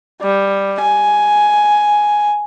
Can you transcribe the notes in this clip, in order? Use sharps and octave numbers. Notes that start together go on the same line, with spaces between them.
G3
G#5